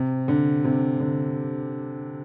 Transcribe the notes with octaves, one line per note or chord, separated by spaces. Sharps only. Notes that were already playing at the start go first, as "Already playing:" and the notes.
Already playing: C3
D3
C3
D3